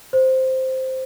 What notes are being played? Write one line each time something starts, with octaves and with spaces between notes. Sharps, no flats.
C5